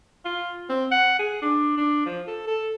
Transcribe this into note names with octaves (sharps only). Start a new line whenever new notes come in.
F4
C4
F#5
G#4
D4
D4
F3
A4
A4